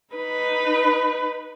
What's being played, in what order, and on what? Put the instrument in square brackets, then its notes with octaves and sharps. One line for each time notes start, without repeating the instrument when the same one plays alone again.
[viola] D#4 B4